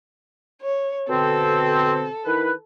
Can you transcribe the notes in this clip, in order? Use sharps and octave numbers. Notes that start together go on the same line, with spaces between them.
C#5
B2 D3 C4 A4
D#3 E4 B4